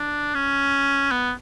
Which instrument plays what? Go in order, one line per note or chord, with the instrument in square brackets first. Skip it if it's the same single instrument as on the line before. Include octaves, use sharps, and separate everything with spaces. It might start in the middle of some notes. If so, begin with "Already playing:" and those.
Already playing: [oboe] D4
C#4
B3